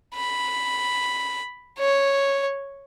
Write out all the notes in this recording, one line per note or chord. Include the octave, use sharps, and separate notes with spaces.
B5
C#5